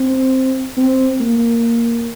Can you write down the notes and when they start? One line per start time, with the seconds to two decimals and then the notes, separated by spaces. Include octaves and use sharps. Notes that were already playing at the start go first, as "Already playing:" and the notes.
Already playing: C4
0.77 C4
1.21 A#3